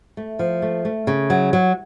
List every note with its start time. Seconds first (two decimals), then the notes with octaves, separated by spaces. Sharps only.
0.17 A3
0.39 F3
0.62 A3
0.85 A3
1.07 C#3
1.30 F#3
1.53 F#3